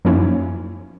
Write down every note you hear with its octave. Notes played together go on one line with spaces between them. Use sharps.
F#2 F3 A#3 C#4 D#4 E4